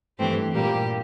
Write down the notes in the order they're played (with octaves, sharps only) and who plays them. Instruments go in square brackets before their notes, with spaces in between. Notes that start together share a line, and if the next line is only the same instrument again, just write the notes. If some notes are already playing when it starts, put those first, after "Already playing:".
[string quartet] G2 E3 A3 C4 G4
A#2 G3 A#3 G4